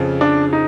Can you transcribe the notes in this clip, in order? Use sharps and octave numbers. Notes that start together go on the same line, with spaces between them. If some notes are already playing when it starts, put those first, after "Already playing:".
Already playing: F2 C#3 F3
D4
D#4